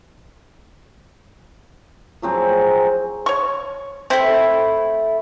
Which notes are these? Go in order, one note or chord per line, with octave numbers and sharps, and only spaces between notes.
F3 F#3 C4 G#4
C#5 C#6
A3 C4 E4